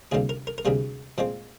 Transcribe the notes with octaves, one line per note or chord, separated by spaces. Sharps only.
D2 C3 G3 A#3 G#4
A#4
A#4
A#4
D2 C3 G3 A#3 G#4
A#2 F3 G#3 C4